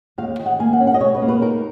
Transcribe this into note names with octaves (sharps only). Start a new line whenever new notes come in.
D#2 F5
D#3
F#5
A#3 G#5
F#5
C#4
F#5
D#5
B2 C#5
B4
A#3
B4
D#4 A#4